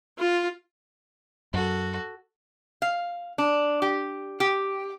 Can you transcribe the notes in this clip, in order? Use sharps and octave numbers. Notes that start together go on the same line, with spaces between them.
F4
F#2 F#4 A4
F5
D4
G4
G4